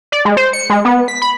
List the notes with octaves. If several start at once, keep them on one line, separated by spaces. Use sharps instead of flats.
D5
G#3
C5
C#7
G#3
B3
B6
B5